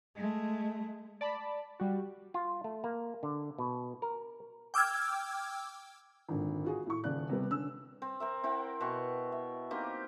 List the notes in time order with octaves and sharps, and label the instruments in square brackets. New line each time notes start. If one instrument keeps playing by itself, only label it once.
[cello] G#3 A3
[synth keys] D5 A5 B5
G3 F#4
[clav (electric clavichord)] F4
A3
A#3
D3
B2
A#4
[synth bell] G5 D6 E6 F6 G#6
[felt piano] G#1 A#2 D3
F4 F#4 G#4
A2 C#6
D#1 C#3 D5 F#6
C3 G3 B3
D3 C#4 E6
[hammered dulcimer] C4
C4 A#4 E5
C4 E4 F#5 G5
B2 C#6
E5
A#3 C4 D#4 G4